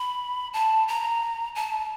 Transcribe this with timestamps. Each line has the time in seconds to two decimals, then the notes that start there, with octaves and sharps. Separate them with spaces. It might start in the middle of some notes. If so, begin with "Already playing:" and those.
Already playing: B5
0.53 A5
0.88 A#5
1.55 A5